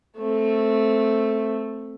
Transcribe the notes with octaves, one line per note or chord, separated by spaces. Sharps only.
A3 C4